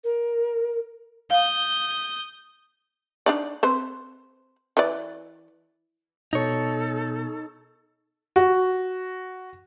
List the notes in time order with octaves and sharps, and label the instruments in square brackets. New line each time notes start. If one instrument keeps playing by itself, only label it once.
[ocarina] A#4
[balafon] F5 [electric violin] D#6 G6
[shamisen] D4 D#4 D5
C4 B4 C5
E3 B4 D5
[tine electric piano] B2 B3 [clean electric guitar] D#4 C#5 [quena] A4
[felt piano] F#4